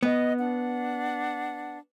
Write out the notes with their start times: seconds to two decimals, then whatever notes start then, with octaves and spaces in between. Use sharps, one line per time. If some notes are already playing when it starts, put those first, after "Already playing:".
0.03 B3 D#5
0.38 D4 F#5